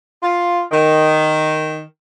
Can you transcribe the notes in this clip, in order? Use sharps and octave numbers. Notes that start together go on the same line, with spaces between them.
F4
D#3